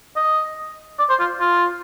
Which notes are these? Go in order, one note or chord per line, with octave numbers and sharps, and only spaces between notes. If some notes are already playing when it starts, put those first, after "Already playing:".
D#5
D5
C5
F4
F4